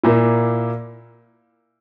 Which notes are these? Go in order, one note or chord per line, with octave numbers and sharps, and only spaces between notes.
A#2 A#3 E4